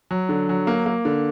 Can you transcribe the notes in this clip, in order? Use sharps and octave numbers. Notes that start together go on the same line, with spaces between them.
F#3
D3
F#3
A#3
A#3
D3